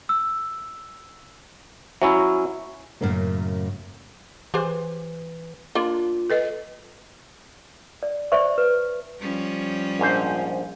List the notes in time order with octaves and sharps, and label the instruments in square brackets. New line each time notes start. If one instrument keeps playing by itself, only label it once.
[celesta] E6
[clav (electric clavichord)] F#3 C#4 E4 [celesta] E5
[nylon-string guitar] F#2 A2 C#3 A#3
[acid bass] E3 [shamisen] G4 G#4 C5
[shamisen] A#3 D4 [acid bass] F4
[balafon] A4 B4 D#5
[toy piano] D5
C5 D5 E5 C#6
B4
[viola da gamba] F3 G3 C#4
[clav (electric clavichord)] A#1 G#2 C5